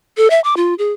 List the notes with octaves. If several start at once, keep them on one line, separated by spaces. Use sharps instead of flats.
A4
E5
D6
F4
G#4